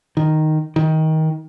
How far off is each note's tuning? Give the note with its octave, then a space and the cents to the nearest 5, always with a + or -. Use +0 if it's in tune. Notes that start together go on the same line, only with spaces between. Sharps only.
D#3 -5
D#3 +20